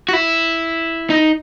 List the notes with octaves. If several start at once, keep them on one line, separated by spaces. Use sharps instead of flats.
F#4
E4
D#4